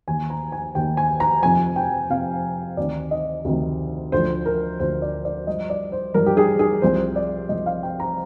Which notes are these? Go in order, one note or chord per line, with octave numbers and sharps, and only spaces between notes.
D#2 D#3 G#5
A#5
G#5
D#2 D#3 G5
G#5
A#5
F2 C3 F3 G#5
G5
F2 C3 F3 F5
D2 C3 D#3 D5
D#5
D2 C3 D#3
D2 D3 F3 C5
A#4
D2 D3 F3 C5
D5
D5
G2 F3 D#5
D5
C5
G2 F3 A#4
G4
G#4
G#4
C2 C3 F3 C5
D5
C2 C3 F3 D#5
F5
G5
A#5